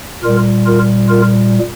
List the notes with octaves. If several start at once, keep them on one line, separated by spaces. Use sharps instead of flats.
A#2 G3 F4 A#4
F4 A#4
F4 A#4